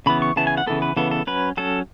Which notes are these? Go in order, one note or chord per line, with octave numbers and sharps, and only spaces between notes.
C#3 E3 B3 B5
C#6
C#3 E3 B3 A5
G#5
F#5
C#3 E3 B3 A4
B4
C#3 E3 B3 A4
A4
F#3 C#4 B4
F#3 C#4 A4